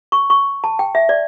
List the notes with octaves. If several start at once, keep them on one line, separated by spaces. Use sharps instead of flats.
C#6
C#6
A5
G5
E5
D5